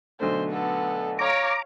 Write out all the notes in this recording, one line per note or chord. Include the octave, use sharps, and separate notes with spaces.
B1 D3 A3 C5
B3 A4
C#5 F5 A#5 D6